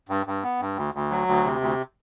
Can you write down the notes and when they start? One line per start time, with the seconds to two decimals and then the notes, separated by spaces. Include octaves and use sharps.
0.09 G2
0.26 G2
0.43 B3
0.60 G2
0.77 D2
0.94 D2
1.11 F#3
1.28 D2
1.44 C3
1.61 D2